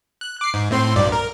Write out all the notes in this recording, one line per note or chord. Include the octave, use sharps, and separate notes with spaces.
F#6
D6 C7
G#2
A2 C4 C6
B1 G2 D5
A#4